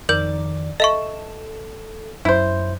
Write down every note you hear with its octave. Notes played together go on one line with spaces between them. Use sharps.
F2 D#3 A#4 D5 G6
A4 D#5 E5 C#6
F#2 E4 C5